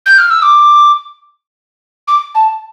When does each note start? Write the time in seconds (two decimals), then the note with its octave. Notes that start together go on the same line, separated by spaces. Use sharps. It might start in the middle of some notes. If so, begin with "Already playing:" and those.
0.06 G6
0.18 F6
0.30 E6
0.42 D6
2.07 D6
2.34 A5